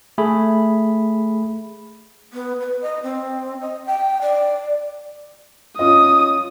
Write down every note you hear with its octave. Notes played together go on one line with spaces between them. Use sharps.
A3 G#4 B5
B3
B4
D#5
C4
D#5
G5
D5
C#4 F4 D#5 D#6